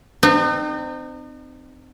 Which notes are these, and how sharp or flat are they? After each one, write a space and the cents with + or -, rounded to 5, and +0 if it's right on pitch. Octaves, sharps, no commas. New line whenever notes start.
C4 -15 D#4 -40